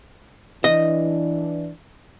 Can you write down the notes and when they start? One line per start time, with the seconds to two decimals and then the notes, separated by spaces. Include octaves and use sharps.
0.64 E3 D4 D#5